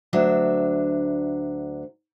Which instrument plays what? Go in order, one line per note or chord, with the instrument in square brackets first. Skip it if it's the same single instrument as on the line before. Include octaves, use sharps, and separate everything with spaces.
[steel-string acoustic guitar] D2 F#3 D4 E5